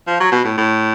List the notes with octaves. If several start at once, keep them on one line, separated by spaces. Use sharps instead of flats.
F3
F#3
B2
A2
A2